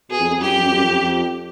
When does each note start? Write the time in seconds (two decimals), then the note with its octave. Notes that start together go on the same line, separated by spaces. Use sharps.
0.10 B2 G#4
0.20 F2
0.30 F2
0.40 F#2 G4
0.56 F2
0.63 F#2
0.70 F2
0.77 F#2
0.84 F2
1.01 F2